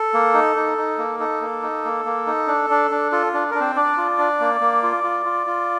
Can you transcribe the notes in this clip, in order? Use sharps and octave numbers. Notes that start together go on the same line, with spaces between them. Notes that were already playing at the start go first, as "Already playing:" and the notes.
Already playing: A4
A#3
D#4
D#4
D#4
A#3
D#4 A4
A#3
D#4
A#3
A#3
D#4
D4
D4
D4
F4 A4
D4
D4 A#4
C4 C5
D4 D5
F4
D4
A#3
A#3
F4
F4
F4
F4